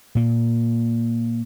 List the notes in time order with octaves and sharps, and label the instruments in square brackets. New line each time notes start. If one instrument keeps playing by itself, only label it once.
[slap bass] A#2 A#3